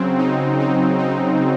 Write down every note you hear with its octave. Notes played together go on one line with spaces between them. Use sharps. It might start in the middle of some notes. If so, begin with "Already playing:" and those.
Already playing: C#3 F#3 C4
D#4
D#4
D#4